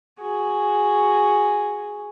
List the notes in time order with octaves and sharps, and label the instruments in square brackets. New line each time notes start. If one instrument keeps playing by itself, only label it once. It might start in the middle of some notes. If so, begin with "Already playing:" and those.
[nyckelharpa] F#4 G#4